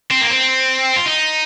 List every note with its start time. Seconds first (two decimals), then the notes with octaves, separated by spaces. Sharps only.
0.11 C4
0.21 A#3
0.30 C4
0.97 F4
1.06 D#4